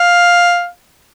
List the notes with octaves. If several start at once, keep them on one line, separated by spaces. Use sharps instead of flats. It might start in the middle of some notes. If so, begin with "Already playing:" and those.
Already playing: F5